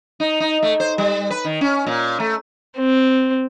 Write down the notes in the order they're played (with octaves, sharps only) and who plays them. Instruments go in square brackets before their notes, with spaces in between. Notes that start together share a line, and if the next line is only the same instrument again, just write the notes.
[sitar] D#4
D#4
A3
C5
G3
B4
D#3
C#4
A#2
A3
[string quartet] C4